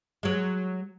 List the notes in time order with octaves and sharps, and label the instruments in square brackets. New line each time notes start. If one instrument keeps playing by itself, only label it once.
[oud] F#3 G#3